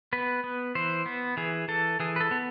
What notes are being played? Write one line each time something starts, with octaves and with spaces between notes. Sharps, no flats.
B3 B4
B3
E3 C5
B3
E3 G#4
E3 A4
E3 G#4
B4
A4
B3